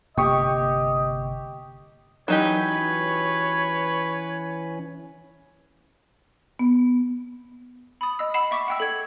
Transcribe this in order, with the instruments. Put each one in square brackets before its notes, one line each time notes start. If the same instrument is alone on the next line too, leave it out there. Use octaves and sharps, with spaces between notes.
[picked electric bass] G1 C3 A#3 [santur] G4 D#6 [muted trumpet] D#5 [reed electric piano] G5 C#6
[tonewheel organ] E3 C#4 [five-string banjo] F#3 D#4 G4 [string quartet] B4 [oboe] C#5
[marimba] B3
[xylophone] B5 D#6
D#5 E6
F#5 B5 C7 E7
E5 C#6 D6 B6
F#5 G5 E6
A4 G#6